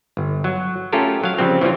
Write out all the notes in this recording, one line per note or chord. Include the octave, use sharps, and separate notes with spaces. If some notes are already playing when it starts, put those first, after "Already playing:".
G1
F#3
A3 C#4 F4 G4 A4 A#4
F#3 F5
C#3 F3 G3 C4
E3 F3 G3 C#4 F4